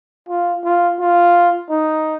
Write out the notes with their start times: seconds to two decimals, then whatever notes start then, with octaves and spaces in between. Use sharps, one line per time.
0.29 F4
0.64 F4
1.00 F4
1.70 D#4